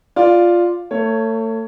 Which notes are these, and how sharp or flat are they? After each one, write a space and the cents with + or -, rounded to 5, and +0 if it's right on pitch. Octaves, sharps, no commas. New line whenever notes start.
F4 +0 D5 +0
A3 +35 C#5 +0